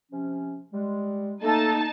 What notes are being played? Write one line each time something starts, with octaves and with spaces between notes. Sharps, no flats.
C3 F3 C#4
G3 G#3
A3 A#3 D#4 A4 A5